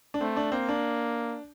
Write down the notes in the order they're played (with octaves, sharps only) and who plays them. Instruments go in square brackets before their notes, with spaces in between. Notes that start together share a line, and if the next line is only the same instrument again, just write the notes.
[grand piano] D4
[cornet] A3 [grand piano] C4
[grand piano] D4
[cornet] A#3 [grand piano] C4
[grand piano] D4